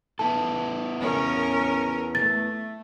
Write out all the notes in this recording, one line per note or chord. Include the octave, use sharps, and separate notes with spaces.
B3 E4 A4 A5
C#4 A#4
A3 A6